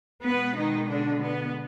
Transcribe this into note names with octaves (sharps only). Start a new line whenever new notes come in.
B2 G#3 B3 B4
D#3 D#4
D3 D4
B3